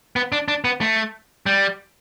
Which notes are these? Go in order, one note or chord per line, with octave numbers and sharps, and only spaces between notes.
B3
D4
D4
B3
A3
G3